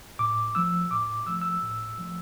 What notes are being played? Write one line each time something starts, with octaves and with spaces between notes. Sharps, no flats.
A2 D6
F3 A3 E6
A2 D6
F3 A3 E6
E6
A2
F3 A3